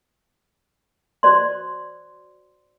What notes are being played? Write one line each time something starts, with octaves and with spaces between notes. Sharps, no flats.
F#4 C5 D5 C6